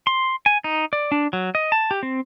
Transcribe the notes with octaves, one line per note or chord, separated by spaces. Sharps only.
C6
G#5
D#4
D5
D4
F#3
D#5
A5
G4
C4